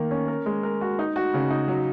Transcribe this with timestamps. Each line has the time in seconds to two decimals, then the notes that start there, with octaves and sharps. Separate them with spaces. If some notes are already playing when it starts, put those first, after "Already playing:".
Already playing: D#3 A#3 A#4
0.11 C#4
0.28 A#4
0.46 G#3
0.63 A#4
0.81 F#4
0.99 D#4
1.16 F#4
1.34 C#3
1.51 D#4
1.68 F#3